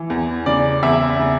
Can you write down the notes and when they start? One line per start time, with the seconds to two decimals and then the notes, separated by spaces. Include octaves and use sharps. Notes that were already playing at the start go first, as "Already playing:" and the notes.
Already playing: E3
0.10 E2
0.46 C#3 D5
0.83 E2 E5
1.19 C#3